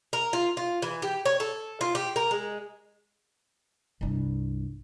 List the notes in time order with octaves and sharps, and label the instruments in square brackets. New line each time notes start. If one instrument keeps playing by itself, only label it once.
[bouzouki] A#4
F4
F4
E3
G4
C#5
A4
F4
G4
A#4
G#3
[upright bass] C2 G2